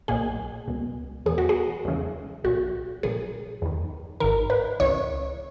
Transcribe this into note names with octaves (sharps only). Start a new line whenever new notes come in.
B1 A#2 G#4
C#2 B2
E2 B2 G#4
F#4
G#4
E2 C#3 E3
B1 A#2 F#4
A#1 A#2 G#4
E2 D#3
G#1 G#2 D#3 A#4
B4
C#2 C#3 E3 C#5